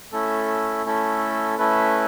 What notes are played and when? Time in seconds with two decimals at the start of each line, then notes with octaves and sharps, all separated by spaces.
0.12 A3 C#4 E4 A4
0.85 A3 C#4 E4 A4
1.58 A3 C#4 E4 A4 B4